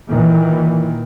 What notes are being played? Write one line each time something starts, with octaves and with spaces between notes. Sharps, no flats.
A#2 D#3 E3